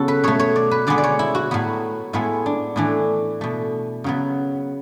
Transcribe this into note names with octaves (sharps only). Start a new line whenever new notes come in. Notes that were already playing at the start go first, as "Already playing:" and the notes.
Already playing: C#3 F#3 B3 F#4 A4
B4
B2 A3 C#5
C#5
D5
B4
D3 G#3 B3 D5
D5
C#5
E4
F#4
A2 F#3 B3
A2 G#3 B3 E4
D4
A2 E3 A3 D4
B2 A3
C#3 F#3 B3